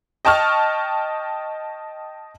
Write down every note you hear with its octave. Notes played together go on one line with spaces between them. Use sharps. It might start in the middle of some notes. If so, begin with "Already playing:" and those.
D#5 G5 A5 C#6 F6